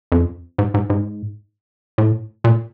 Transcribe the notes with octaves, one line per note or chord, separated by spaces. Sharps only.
F2
G#2
G#2
G#2
A2
A#2